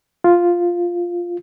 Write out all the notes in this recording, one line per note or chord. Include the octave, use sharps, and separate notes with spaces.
F4